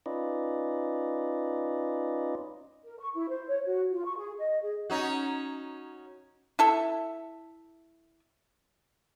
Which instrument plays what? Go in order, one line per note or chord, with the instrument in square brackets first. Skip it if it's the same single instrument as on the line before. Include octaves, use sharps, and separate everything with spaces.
[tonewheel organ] C#4 D#4 F4 B4 D5 D#5
[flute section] A#4
C#6
E4
C5
C#5
F#4
F4
C#6
G#4
D#5
G#4
[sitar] C#4 D#4 F#4
[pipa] E4 A4 E5